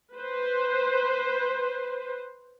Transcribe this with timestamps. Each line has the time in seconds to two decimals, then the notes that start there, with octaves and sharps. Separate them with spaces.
0.14 B4 C5